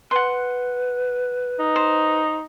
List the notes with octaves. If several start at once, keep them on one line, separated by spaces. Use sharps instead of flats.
B4 F#5 C6
D#4
C5